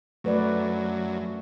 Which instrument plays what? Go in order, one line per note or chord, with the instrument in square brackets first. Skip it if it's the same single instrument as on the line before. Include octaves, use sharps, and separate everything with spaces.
[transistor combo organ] F#2 [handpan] A3 B4 D5